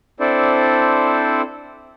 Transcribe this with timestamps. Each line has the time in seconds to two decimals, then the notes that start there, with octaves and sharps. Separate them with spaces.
0.20 C4 D4 E4 A4 C5 D5